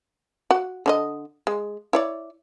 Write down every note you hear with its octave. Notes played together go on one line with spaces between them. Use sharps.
F#4 F#5
D3 D4 D#5
G#3
E4 C#5 D5